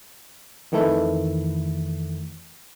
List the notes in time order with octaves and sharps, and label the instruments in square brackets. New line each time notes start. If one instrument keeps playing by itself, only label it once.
[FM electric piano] F2 D#3 E3 A3 E4